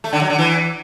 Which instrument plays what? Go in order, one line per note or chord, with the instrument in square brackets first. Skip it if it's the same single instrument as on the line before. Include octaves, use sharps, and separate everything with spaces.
[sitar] A3
D3
F#3
D3
E3